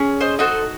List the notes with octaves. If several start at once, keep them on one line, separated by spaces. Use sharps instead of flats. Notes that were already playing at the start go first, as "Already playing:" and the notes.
Already playing: C#4 G#4
C5 D#5
D#4 F#4 A4 C5 D#5